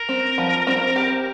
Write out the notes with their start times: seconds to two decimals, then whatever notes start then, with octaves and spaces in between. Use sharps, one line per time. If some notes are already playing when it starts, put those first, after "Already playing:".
Already playing: A#4
0.09 C4
0.38 F3
0.67 C4
0.96 G4